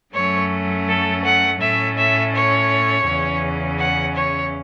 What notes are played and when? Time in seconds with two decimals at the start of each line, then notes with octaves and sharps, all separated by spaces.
0.14 F#2 F#3 A3 C#4 C#5
0.88 A4
1.24 F#5
1.60 A2 A3 C#4 E5
1.97 E5
2.34 C#5
3.06 E2 C#3 E3 C#4
3.79 F#5
4.16 C#5